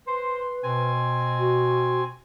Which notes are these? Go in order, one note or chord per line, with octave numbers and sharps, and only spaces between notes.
B4 C5 C6
B2 C4 G#5
F#4